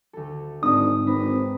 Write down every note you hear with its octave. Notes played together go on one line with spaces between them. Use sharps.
D2 A4
G#1 G#2 D4 D#4 D#6
G#1 C4 D4 B4 A#5